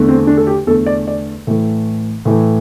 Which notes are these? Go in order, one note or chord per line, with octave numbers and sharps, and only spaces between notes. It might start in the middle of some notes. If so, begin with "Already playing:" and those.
Already playing: E2 D3 A3
C4
D4
A4
G4
E2 D3 A3 A4
D5
D5
A2 E3 A3
A2 E3 A3